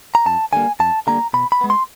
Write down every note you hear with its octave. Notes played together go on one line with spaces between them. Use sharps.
A#5
F2 A5
D3 G3 A#3 G#5
F2 A5
D3 G3 A#3 A#5
B2 B5
B5
G#3 B3
C6